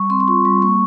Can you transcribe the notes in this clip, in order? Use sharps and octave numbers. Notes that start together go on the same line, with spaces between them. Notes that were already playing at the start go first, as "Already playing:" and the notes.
Already playing: G3 C#6
C4 C6
C6
F4 C#6
G3 C#6
A#3 C#6